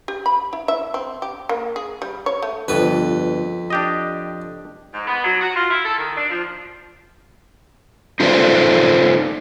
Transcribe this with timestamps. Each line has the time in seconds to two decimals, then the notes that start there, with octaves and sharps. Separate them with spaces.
0.08 G4
0.26 B5
0.53 E4
0.68 E5
0.94 C4
1.22 G4
1.49 A#3
1.76 G#4
2.02 G3
2.26 C#5
2.42 A3
2.68 G1 F2 B4
3.70 D4 G4 D#5
4.93 G#2
5.07 B3
5.23 F#3
5.40 F#4
5.55 F4
5.69 E4
5.84 A4
5.97 D#3
6.15 D4
6.29 F3
8.20 D#4 F4 A4 C5 D5